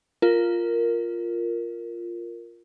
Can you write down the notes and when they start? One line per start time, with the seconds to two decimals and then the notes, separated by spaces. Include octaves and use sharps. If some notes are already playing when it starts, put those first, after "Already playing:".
0.22 F4 A#4